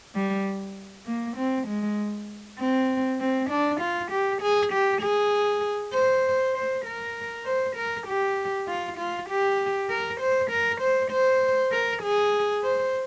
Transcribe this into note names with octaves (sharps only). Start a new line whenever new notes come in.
G3
A#3
C4
G#3
C4
C4
D4
F4
G4
G#4
G4
G#4
C5
C5
A#4
C5
A#4
G4
F4
F4
G4
A#4
C5
A#4
C5
C5
A#4
G#4
C5